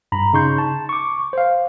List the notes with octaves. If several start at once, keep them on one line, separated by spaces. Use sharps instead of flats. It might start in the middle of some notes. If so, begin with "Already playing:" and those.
G2 A#5 B5
C#3 D#4 C6 C#6 G6
A5
C#6 D6
C5 F5